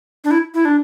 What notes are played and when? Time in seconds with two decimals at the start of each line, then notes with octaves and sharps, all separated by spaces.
0.24 D4
0.31 E4
0.54 E4
0.65 D4